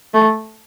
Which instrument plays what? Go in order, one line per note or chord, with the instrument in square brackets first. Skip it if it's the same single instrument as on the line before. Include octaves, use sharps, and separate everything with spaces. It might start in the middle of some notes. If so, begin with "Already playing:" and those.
[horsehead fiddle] A3